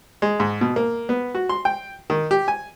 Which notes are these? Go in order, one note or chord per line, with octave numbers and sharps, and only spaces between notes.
G#3
G#2
B2
A#3
B3
F#4
C6
G5
D#3
G4
G#5